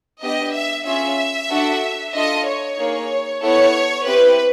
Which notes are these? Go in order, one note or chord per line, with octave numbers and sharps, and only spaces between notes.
B3 D4 G4 D#5
E5
C#4 F4 G#4 E5
D4 F#4 A4
D4 F4 A4 D#5
C#5
A#3 D#4 G#4
B3 E4 A4 C#5
C4 E4 G4 B4